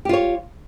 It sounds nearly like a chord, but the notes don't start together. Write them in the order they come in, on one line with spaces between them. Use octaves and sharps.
G4 F4 C#5